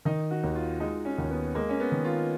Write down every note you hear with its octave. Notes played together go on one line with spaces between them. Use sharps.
D#3 D#4
F#4
D#2
F4
G#3 D#4
C#4
D#2
B3
G#3 A#3
C#4
B3
D#3
F4